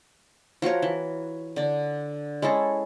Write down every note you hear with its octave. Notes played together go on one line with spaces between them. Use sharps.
F3 F#4 A#4 C#5
E3
D3 D4
G#3 C#4 E4 A4